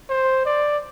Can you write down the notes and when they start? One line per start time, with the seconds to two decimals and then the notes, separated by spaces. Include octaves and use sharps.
0.10 C5
0.46 D5